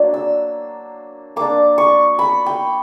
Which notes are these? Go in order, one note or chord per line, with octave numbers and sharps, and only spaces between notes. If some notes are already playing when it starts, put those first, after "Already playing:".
Already playing: F#3 A#3 D4
E6
A#3 D4 D6
C#6
B5
G5